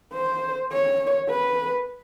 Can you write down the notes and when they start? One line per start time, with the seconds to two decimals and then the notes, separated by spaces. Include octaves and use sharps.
0.13 C5
0.72 C#5
1.30 B4